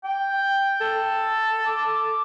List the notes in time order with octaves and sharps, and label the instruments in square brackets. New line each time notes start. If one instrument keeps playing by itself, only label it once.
[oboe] G5
[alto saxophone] A4
[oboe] D6